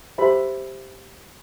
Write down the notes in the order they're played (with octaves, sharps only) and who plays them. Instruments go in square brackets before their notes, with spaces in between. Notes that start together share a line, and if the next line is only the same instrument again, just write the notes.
[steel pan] G4 C5 E5 B5